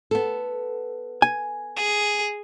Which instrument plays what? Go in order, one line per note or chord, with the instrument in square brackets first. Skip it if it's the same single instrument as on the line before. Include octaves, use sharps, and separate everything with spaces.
[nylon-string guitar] B3 A4
[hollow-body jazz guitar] G#5
[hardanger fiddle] G#4